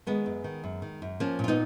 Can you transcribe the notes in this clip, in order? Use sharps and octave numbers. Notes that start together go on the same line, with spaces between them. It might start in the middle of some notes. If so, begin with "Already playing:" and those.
D#3 G#3 B3
F#2
D#3
F#2
D#3
F#2
F3 A#3 C#4
A#2 F4
B3 D#4